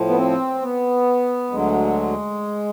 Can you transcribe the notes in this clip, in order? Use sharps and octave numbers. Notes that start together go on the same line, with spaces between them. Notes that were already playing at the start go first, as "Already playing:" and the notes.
Already playing: A2 F3
B3
C4
B3
D2 D3 F#3 G#3